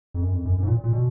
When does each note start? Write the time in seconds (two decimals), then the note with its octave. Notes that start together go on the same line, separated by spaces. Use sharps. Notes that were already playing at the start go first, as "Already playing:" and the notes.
0.14 F2
0.22 F#2
0.33 F2
0.45 F#2
0.58 F#2
0.63 G#2
0.67 A#2
0.84 A#2
0.93 B2